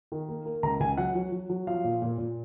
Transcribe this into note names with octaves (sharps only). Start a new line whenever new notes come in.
D#3
A#3
A#3
C#2 A#5
C#2 G#5
F#3 F#5
F#3
F#3
F#3
F3 F5
A#2
A#2
A#2